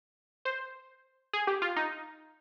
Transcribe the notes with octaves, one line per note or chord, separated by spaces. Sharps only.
C5
G#4
G4
F4
D#4